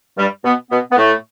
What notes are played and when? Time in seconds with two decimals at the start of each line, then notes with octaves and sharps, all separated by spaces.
0.18 G2 G3
0.44 B2 B3
0.71 B2 B3
0.91 B3
0.97 A2 A3